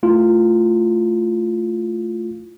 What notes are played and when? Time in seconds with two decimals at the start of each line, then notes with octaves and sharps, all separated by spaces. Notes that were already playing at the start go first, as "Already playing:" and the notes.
0.03 A3 E4 F4